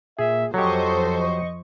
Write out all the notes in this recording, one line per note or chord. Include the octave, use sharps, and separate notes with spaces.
A#2 G#4 E5
F2 F#3 G4 A4 C5 D#5 C#6